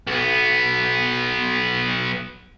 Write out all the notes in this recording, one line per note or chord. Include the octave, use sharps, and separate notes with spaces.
B1 B3